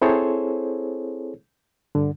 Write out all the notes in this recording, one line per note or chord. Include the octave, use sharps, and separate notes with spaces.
C4 E4 G#4 A4 C5 C#5
G2 D3